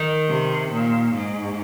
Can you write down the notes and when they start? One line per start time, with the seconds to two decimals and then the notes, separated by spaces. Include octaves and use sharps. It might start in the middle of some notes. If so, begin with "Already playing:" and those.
Already playing: D#3
0.29 C3
0.72 A#2
1.15 G#2